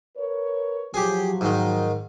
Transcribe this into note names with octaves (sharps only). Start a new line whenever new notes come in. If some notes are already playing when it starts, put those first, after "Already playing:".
A#4 B4 C#5
F3 F#3 G4 G#4
G#2 D#3